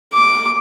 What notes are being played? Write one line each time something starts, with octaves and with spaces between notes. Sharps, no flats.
D6